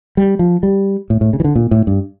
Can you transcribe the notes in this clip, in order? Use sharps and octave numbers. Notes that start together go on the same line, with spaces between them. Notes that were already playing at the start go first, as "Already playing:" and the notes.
G3
F3
G3
A2
A2
C#3
E3
D3
A#2
A2
G2